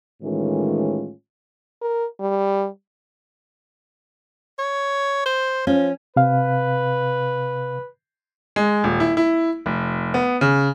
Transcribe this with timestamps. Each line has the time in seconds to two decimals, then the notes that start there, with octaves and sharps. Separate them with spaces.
0.23 A2 D#3 E3 G#3 C#4 F4
1.81 A#4
2.20 G3
4.59 C#5
5.26 C5
5.67 F3 C#4
6.16 C3 B4 F5
8.56 G#3
8.84 D#1
9.00 E4
9.17 E4
9.66 F1
10.14 B3
10.41 C#3